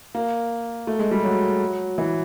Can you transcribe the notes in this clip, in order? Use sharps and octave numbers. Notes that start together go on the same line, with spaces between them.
A#3
A3
G#3
G3
F#3
E3